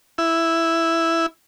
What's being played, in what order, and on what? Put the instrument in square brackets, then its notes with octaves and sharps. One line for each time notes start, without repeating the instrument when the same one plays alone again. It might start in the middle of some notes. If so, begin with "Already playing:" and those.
[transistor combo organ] E4